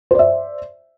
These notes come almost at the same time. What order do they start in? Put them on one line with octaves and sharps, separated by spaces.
C5 D5 E5